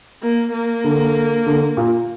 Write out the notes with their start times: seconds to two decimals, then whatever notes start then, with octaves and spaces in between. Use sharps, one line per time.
0.22 A#3
0.53 A#3
0.84 D3
1.46 D3
1.77 A#2